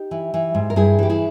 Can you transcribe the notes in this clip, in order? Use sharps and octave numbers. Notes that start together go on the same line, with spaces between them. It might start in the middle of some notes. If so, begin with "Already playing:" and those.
Already playing: D#4 G4
E3
E3
G#2
A#4
G2 E4 G#4
E3 G4
E4 G#4